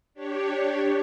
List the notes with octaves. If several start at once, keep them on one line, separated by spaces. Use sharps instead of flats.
D4 G4 C#5